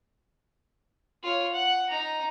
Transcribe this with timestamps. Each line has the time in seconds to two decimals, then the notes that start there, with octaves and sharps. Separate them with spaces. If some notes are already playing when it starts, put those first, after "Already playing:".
1.23 F4 C#5
1.52 F#5
1.89 D#4 A#5